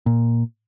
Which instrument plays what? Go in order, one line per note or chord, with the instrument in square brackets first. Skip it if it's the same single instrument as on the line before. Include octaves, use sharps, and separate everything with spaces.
[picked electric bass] A#2